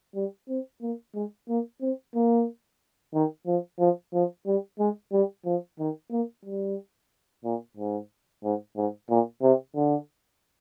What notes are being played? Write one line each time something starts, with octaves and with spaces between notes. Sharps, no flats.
G3
C4
A#3
G#3
A#3
C4
A#3
D#3
F3
F3
F3
G3
G#3
G3
F3
D#3
A#3
G3
A#2
G#2
G#2
G#2
A#2
C3
D3